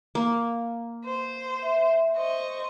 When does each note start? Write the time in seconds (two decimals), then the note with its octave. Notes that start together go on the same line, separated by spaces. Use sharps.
0.15 A#3
1.05 C5
1.63 E5
2.15 C5 D#5 C#6